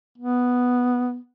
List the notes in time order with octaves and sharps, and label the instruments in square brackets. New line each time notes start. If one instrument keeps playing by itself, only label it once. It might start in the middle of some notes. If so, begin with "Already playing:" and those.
[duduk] B3